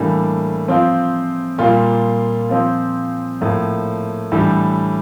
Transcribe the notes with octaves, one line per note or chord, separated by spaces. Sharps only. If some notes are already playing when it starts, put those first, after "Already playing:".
Already playing: A2 E3 G3 A#3 D4
F3 C4 F4
A#2 G3 A#3 F4
F3 C4 F4
A2 F3 A#3
A2 E3 G3 D4 G4